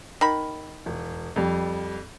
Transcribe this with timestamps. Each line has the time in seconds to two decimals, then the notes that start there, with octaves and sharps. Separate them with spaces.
0.21 D#3 B5
0.86 E1
1.36 F2 G3